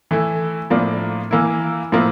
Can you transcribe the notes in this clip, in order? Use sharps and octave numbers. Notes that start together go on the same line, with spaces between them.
E3 A3 E4
A2 F3 A#3 D4
E3 A#3 E4
A2 F3 A#3 E4